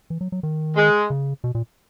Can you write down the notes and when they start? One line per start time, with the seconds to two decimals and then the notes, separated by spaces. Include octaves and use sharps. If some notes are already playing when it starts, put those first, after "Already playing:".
0.10 E3
0.21 F#3
0.32 F#3
0.43 D#3
0.76 G#3
1.10 C#3
1.44 B2
1.55 A#2